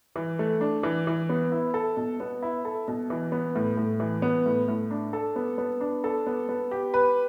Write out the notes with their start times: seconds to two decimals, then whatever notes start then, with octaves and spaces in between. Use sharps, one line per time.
0.16 E3
0.39 A3
0.61 D4
0.83 E3
1.07 E3
1.29 B3
1.52 E4
1.74 A4
1.97 B2
2.20 B3
2.43 E4
2.65 A4
2.88 B2
3.10 E3
3.32 B3
3.55 A2
3.77 A2
4.00 E3
4.22 B3
4.46 A2
4.68 A2
4.91 D4
5.13 A4
5.36 B3
5.58 B3
5.81 D4
6.04 A4
6.27 B3
6.49 B3
6.71 G4
6.94 B4